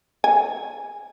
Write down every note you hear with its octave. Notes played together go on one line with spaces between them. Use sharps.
G#5